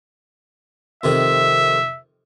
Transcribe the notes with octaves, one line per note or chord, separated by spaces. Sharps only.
F2 C3 D#3 E5